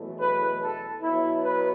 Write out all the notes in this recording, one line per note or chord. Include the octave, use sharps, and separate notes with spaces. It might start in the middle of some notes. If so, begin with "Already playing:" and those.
Already playing: E2 B2 F#3 A3
B4
A4
B2 F#3 B3 E4
B4